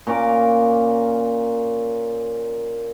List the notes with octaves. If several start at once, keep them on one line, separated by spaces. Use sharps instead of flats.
A#2 C#4 A#4 D6